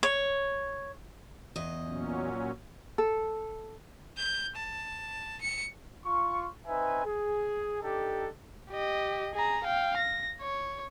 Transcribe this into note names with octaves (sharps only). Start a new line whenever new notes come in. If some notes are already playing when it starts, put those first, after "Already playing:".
C#5
E2 D#5
A#2 F#3 C#4
A4
G6
A5
C#7
F4 C#6
C4 D#4 B4 E5 G#5
G#4
D4 D#4 G4 A4
G4 D#5
G#4 A#5
F5 G5
A#6
C#5